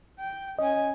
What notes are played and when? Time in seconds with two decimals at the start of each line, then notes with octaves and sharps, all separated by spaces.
0.19 G5
0.59 C#4 D#5 G#5